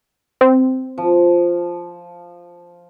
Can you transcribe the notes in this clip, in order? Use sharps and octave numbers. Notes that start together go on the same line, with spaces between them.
C4
F3